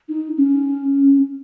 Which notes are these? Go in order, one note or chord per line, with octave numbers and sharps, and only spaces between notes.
D#4
C#4